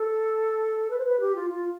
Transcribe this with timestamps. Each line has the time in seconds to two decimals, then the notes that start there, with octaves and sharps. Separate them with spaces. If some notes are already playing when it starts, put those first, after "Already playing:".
Already playing: A4
0.90 B4
0.98 C5
1.05 B4
1.20 G4
1.35 F4
1.50 F4